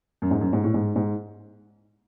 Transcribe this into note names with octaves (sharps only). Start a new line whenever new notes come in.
F#2
G#2
F#2
G#2
A2
G#2
G#2